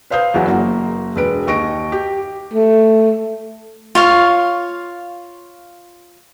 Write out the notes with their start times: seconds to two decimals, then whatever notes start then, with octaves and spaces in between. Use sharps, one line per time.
0.10 B4 C5 F5 D#6 G6
0.34 E2 E3 F#3 E4 F#5
0.47 F#1 A#3 F#4 A#5
1.16 E1 B4 D7
1.47 D#2 D#5 C#6 A#6 D7
1.92 G4
2.53 A3
3.95 F4 C#5 F5